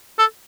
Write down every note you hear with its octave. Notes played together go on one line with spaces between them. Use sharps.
A4